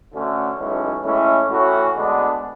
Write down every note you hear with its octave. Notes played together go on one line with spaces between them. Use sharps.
D2 D3 A3 C#4
B1 A2 E3 G#3 C#4
A2 E3 G#3 C#4 E4
A2 E3 A3 C#4 F#4
D2 D3 G#3 B3 D4